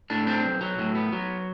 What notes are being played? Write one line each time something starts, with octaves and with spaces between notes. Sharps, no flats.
A2 D4
C4 D4
B1
F#3
A2
B3
F#3